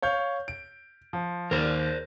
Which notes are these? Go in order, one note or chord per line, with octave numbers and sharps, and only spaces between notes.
C#5 F5 G6
D7
F3
D#2 A#4 C5